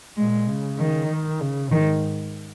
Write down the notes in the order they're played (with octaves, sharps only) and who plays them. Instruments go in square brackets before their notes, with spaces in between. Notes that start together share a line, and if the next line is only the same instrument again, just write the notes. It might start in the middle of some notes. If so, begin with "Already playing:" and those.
[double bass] A#2 [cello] G#3
[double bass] C#3
[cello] D#3
[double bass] D#3
C#3
[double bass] G#2 [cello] D#3